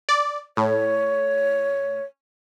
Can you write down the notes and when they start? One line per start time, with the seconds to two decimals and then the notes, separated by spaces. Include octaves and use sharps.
0.09 D5
0.57 A2 C#5